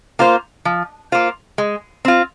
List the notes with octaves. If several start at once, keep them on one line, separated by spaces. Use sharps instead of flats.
A#3 F4 C5
F3
A#3 F4 C5
G#3
C4 F4